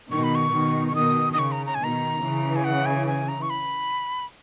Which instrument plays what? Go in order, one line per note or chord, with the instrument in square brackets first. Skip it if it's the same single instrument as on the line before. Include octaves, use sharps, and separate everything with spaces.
[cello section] B2 D#3 [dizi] C#6
[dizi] B5
C#6
[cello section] B2 D#3
[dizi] C#6
[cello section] B2 D#3 [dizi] D#6
[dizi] D#6
[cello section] C#3 [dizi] C#6
[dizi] A#5
A#5
G#5
[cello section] B2 D#3 [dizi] A#5
[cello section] C#3 E3
[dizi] G#5
F#5
G#5
G#5
A#5
C#6
B5